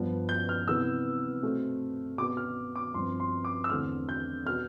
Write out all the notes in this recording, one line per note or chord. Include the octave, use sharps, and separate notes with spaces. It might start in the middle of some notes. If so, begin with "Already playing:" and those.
Already playing: G2 F3 B3
G6
F6
C3 E3 B3 E6
B2 A3 C4
B2 B3 D6
F6
D6
G2 F3 C4 C6
C6
D6
E6
E2 D3 A3 C4 F6
G6
B2 B3 F6